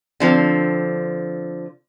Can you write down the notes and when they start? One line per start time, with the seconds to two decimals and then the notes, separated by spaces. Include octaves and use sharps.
0.20 D3 F3 C4